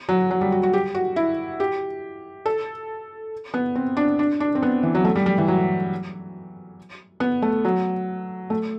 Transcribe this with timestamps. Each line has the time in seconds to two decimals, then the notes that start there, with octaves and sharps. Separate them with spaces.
0.09 F#3
0.31 F#3
0.41 G3
0.52 F#4
0.63 F#4
0.73 G4
0.95 F#4
1.16 E4
1.60 G4
2.46 A4
3.54 B3
3.75 C4
3.97 D4
4.19 D4
4.40 D4
4.55 C4
4.62 B3
4.83 E3
4.95 F#3
5.05 A3
5.16 G3
5.26 G3
5.38 E3
5.48 F#3
7.20 B3
7.42 A3
7.65 F#3
8.50 A3